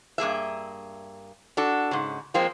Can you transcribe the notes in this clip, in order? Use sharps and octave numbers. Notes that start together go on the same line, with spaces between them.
G2 A#3 G#4 E5
D4 F#4 A4
G#2 C#3
F3 G#3 A#3 C4